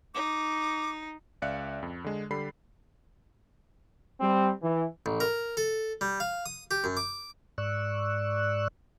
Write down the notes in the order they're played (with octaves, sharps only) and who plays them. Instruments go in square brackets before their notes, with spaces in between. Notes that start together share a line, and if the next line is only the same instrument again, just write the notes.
[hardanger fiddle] D#4 [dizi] D6
[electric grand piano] C#2 D5 E5 F5 F#6 C#7
F2
D3 G#3
D3 G3 G4 A4 B5 C7
[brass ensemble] G3 C4
E3
[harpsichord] A1
A#4
A4
G3
F5
D#6
G4
F#2
D6
[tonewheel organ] G#2 D5 C#6 E6 F#6